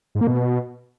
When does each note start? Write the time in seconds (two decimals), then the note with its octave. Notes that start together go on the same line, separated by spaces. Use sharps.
0.15 G#2
0.21 A#3
0.27 B2